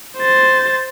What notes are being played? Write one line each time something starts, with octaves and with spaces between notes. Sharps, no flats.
C5 A6